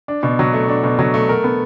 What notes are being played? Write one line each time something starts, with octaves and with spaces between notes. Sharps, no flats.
D4
B2
F#3
A3
D4
B2
F#3
A3
A#4
B3